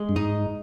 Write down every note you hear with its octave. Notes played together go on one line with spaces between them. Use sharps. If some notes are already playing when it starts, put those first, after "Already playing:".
Already playing: G#3
G2
G#2 D#4